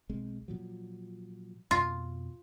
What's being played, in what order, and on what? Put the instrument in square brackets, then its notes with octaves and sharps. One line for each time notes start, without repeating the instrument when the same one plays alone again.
[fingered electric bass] B1 G#3 C4
A#2 F3 F#3
[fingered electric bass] F2 B2 [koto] F4